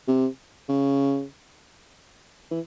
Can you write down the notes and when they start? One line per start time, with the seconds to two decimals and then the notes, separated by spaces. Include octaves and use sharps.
0.08 C3
0.69 C#3
2.51 E3